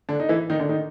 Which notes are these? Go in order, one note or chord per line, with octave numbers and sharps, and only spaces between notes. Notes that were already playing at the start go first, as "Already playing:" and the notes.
D3 D4
D#4
E3 E4
D#3 D#4
D3 D4
D#3 D#4